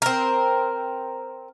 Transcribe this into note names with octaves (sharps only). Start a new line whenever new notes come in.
C4 A#4